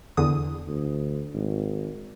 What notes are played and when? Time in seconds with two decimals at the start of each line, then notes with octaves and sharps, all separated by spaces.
0.17 E2 D3 D#6
0.68 D2
1.34 G#1